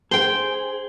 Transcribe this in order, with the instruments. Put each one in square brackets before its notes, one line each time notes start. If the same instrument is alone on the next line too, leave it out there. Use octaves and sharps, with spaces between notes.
[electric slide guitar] G#4 [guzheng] C5 G5 [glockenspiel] G7